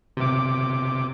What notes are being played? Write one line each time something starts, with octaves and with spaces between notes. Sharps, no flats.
C3 D6